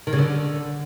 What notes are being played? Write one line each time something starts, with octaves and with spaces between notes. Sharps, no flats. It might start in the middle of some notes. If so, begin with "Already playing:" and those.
D#3
C#3
D3